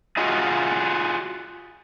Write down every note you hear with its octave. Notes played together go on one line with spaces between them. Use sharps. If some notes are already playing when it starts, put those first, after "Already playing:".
F4 F#4 G#4 D#5